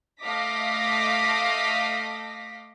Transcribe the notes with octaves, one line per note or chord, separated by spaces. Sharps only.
A3 D#5 F5 D6 A#6 B6